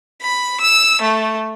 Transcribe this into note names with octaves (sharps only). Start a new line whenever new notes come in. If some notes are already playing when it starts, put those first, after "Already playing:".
B5
E6
A3